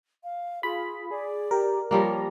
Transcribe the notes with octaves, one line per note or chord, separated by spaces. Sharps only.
F5
F4 G#4 B5
G#4 D5
G4 A#4
F3 G3 A#3 C#5 A#5